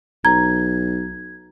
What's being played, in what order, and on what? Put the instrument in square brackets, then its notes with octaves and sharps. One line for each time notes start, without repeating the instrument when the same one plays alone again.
[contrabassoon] B1 [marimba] A#5 [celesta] G#6